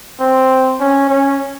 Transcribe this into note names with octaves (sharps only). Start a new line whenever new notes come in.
C4
C#4
C#4